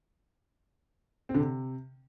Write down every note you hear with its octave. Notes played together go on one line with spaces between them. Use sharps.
C4
D3
C3